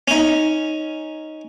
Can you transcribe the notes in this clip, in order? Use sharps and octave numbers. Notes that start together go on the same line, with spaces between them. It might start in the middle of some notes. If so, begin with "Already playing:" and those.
C#4 D#4